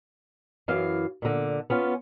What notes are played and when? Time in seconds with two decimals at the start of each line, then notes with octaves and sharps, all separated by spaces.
0.68 F#2 E3 F5
1.22 A#2 D3
1.70 B3 C#4 F4